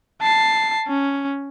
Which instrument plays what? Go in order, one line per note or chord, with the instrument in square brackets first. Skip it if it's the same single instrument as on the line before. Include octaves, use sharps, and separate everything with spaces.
[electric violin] A5 C7
C#4